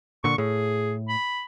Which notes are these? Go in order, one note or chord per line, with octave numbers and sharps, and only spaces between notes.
A#2 D3 C#6
A2 G#4
B5